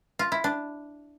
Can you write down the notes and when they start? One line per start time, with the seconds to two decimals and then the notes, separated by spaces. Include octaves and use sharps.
0.19 F4
0.32 E4
0.44 D4